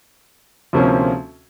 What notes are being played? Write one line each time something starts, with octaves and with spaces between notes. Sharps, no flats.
D2 C3 F3 A#3 C#4